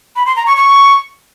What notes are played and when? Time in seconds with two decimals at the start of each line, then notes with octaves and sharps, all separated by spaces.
0.16 B5
0.26 C6
0.36 A#5
0.46 C#6
0.57 C#6